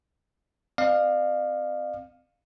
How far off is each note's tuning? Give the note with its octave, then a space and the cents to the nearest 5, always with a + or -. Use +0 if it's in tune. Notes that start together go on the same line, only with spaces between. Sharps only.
C4 -10 D5 +45 F5 +5